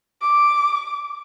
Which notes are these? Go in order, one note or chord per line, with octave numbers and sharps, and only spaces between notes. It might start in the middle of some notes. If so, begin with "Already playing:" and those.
D6